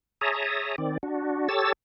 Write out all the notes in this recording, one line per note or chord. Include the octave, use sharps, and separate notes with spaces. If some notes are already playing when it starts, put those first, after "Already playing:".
G#4 C#5 E5 A5 A#5 D#6
D#3 C4 D5
D4 F#4
G4 A4 C#5 E6 A6